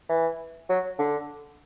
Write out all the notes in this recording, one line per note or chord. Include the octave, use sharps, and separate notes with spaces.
E3
F#3
D3